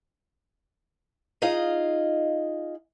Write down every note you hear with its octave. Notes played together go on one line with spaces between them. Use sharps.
D#4 F4 G#4 D#5 F5